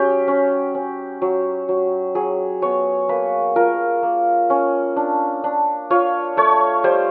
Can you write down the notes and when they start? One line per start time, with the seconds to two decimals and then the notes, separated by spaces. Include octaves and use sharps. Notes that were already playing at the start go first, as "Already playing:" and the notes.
Already playing: F#3 C#4 G4
0.28 C#4
0.75 C#4
1.22 F#3
1.69 F#3
2.15 F#3 G#4
2.62 B3 C#5
3.09 A#3 B4
3.56 F4 A#4
4.03 A#3
4.50 C#4
4.96 D4
5.44 D4
5.90 F4 C#5
6.37 A3 C#5
6.84 G3 C5